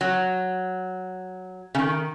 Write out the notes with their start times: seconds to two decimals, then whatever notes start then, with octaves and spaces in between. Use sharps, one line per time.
0.01 F#3
1.75 C#3
1.79 D#3